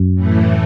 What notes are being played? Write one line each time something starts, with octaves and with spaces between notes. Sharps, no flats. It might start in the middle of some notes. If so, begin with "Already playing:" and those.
Already playing: F#2
A2 E3 A3